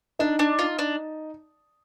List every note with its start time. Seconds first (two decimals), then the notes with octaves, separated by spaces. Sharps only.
0.19 D4 D#4
0.39 D4
0.59 F4
0.79 D4